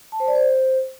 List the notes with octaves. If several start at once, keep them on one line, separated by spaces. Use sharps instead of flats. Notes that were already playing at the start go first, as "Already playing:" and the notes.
A5
C5
D5
C5